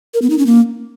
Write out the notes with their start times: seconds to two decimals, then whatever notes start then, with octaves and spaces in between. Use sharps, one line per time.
0.14 A#4
0.22 B3
0.30 D#4
0.38 C#4
0.46 A#3